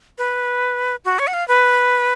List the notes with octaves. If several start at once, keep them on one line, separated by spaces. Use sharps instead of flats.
B4
F#4
C#5
F#5
F5
B4